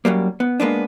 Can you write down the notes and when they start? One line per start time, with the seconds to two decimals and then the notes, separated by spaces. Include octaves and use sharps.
0.05 F#2 F#3 G3 A#3
0.40 B3
0.60 G#3 A#3 B3 D4